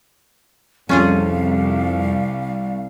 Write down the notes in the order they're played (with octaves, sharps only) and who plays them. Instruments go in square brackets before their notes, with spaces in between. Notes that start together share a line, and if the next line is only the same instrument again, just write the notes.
[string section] C2 [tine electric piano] F2 [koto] C#4 F4 G#4 [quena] F5